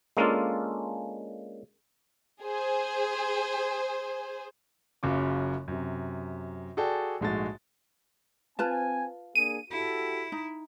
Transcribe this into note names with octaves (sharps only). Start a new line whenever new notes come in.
G#3 A#3 C#4 D4 F4 A4
G#4 C5
F#1 F#2 C#3 F#3 F4 D6
F#2 C3
F#4 G#4 A4 D5 G5 A5
A#1 G#2 G#3 A3 F#4 A6
C4 F4 B4 G#5 A5
A#3 D4 G#4 D#7
E4 F#4 G4 A4
D#4